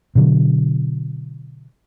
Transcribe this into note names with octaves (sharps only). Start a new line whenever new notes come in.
B2 D3 F#3